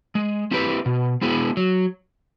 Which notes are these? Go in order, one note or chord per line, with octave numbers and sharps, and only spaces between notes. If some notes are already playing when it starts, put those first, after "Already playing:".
G#3
C4 E4 G4 B4
B2
G#3 B3 E4 G#4
F#3